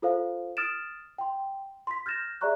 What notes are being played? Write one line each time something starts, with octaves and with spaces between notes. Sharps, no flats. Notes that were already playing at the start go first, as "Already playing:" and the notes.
F4 A4 C5 F5
D#6 F6 A6 D7 E7
G5 C6
C6 B6
F6 G6 A6 A#6 E7
G#4 D5 E5 A#5 C#6 F#6